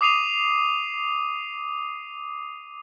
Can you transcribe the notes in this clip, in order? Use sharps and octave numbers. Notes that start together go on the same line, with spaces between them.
D6 D#6 C7 D#7 F7